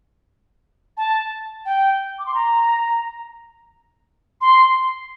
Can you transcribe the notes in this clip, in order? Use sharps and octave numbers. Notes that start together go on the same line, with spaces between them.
A5
G5
D6
C6
A#5
C6